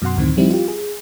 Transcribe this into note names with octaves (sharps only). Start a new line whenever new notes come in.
F#2 B2 F#3 F#5 C6
D2 A2 D#3 C4
F3 G3 C4 D#4 E4
F4 G4
G#4